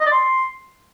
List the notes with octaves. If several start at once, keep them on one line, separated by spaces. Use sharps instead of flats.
D#5
D5
C6